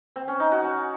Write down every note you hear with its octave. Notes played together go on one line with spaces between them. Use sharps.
C4
C#4
D#4
F#4
C#4